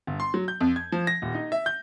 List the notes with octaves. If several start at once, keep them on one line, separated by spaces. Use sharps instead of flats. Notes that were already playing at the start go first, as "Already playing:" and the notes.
G1
C6
F#3
G6
F2
G#6
F3
A#6
D#1
D#4
E5
G6